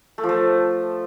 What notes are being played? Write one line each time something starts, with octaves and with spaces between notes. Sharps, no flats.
A3
F3
A3